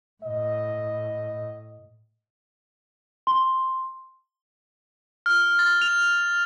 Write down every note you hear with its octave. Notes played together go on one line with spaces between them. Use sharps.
A2 D#5
C6
F6
A6
F7